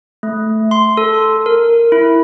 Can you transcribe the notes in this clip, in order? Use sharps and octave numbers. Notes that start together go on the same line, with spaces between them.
A3
C6
A4
A#4
E4